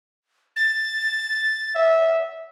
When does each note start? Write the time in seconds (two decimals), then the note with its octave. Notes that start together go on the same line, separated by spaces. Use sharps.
0.56 A6
1.75 E5